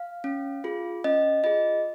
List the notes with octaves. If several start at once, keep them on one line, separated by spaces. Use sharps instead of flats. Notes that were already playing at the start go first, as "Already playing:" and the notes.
Already playing: F5
C#4
F4 G#4
C#4 D#5
F4 G#4 D#5